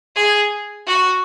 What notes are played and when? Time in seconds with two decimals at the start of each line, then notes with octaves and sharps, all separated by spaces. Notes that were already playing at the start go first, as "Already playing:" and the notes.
0.16 G#4
0.87 F#4